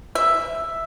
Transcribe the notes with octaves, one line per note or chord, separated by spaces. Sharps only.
E5